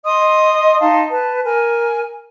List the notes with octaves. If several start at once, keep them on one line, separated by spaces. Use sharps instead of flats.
D#5 C6 D#6
D#4 F5 A5 C6
B4 A5
A#4 G#5